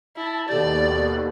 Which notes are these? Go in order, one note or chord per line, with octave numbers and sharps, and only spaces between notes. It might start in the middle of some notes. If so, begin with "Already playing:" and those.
E4 A5
D#2 B2 G4 A4 D5